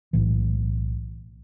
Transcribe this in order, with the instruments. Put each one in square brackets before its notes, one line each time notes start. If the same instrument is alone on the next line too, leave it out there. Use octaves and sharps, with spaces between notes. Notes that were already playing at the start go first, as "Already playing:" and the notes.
[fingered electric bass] B1 A2 E3